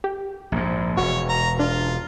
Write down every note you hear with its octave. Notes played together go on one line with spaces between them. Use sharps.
G4
A#1 G#2
E1 F#4 C#5
A#5
D4 F4